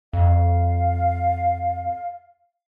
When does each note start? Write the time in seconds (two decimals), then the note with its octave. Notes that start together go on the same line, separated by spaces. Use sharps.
0.13 F2 F5